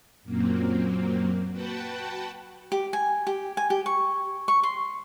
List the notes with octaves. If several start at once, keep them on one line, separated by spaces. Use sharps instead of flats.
F#2 A#2 F#3 A#3 C4
F#4 B4 F#5 G5 A5
G4
G#5
G4
G#5
G4
C#6
C#6
C6